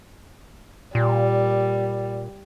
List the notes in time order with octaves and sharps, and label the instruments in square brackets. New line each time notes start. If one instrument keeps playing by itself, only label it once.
[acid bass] A#2 [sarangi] G3